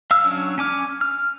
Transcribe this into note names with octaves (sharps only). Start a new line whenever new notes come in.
F5 E6 F6
F#3 C#4 D4
C#4 G#5 D6 F6
F6